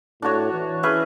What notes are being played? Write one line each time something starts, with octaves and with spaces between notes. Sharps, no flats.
A2 D4 F#4 C#5
E3
C#4 G#4 B4 E5